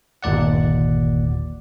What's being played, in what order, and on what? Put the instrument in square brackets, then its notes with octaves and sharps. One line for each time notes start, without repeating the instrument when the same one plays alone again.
[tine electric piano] G1 D#2 A#2 D5 F#5